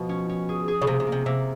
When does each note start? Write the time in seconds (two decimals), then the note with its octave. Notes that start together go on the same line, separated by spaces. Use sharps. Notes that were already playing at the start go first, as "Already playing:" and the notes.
Already playing: B2 F3
0.09 C#4
0.29 C#4
0.49 G#4
0.68 G#4
0.82 C#3
0.87 C3 A#3
1.00 C3
1.07 A#3
1.12 C3
1.26 C3 A#3